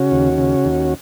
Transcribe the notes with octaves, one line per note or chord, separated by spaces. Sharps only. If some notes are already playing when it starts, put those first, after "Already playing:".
Already playing: C#3 C#4 F#4
D#2
C#3
D#2